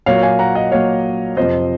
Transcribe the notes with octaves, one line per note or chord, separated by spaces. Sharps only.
A#2 F#3 A#3 C#5 F5
F5 G#5
F#5 A#5
D#5 F#5
A#2 F#3 A#3 C#5 F5
F2 C3 F3 C5 D#5